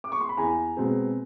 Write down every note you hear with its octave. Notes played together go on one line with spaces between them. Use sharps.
D6
C#6
C6
B5
E2 G#5 A#5
B2 G#3 C4